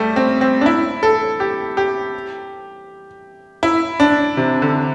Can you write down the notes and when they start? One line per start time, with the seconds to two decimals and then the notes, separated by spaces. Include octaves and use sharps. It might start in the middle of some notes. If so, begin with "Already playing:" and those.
Already playing: G3 A3
0.16 C4
0.41 C4
0.61 D4
0.66 E4
1.03 A4
1.40 G4
1.77 G4
3.63 E4
4.00 D4
4.37 C3
4.62 D3